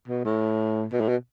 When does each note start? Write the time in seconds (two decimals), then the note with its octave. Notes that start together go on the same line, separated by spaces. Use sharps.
0.08 B2
0.25 A2
0.92 B2
1.01 A2
1.08 B2